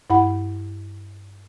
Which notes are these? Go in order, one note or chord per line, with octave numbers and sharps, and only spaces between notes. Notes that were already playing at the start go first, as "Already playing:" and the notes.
G2 E4 F#5 B5